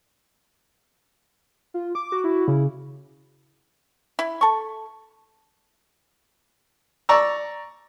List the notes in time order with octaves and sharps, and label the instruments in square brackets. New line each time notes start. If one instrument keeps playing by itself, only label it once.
[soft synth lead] F4
D6
[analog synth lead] F#4
[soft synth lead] E4
[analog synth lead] C#3
[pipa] E4
A4 C#6
[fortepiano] D5 A#5 C#6 E6